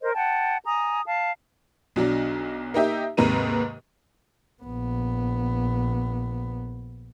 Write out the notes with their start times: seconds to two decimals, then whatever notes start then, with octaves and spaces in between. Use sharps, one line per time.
0.01 A#4 C5 D#5
0.14 F#5 G5 A5
0.65 G#5 A#5 D#6
1.06 F5 A5
1.96 B1 F#3 D4
2.74 A#3 D#4 G4 E5
3.17 D#2 G#2 C3 A#4 B4 D#7
4.63 A#1 B3